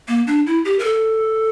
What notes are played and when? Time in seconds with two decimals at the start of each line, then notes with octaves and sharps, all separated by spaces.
0.08 A#3
0.27 D4
0.46 E4
0.65 G4
0.79 A#4
0.85 A4